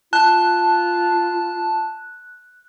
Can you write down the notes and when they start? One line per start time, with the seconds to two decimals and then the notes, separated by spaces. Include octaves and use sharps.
0.13 F4 A5 F#6